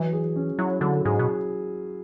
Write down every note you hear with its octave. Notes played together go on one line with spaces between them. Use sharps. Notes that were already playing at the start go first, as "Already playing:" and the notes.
Already playing: E3 F#3
G#4
C#4
F#3 E4
D3 F#3
G#2 G#4
B2